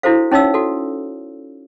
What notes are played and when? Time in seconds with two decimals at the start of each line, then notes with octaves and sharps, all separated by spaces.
0.03 D4 E4 F#4 A4 C5 F5
0.32 C#4 D#4 C#5 D#5 F5 E6
0.54 F#4 A4